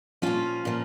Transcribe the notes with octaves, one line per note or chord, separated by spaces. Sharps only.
A#2 F3 C#4 F4
A#2 F3